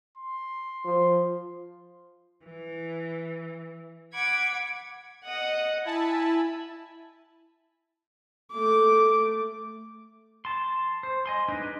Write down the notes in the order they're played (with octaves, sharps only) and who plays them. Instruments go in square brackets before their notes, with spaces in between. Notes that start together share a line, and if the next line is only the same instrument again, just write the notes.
[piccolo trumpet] C6
[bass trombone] F3
[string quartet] E3
F#5 B5 D6 G#6
[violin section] D#5 F#5 D#6
[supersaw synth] E4 A5 [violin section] G#5 B5
[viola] A3 D6
[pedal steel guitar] A5 C6
C5
D#5 G#5 C6
G#3 D4 D#4 B4 D#5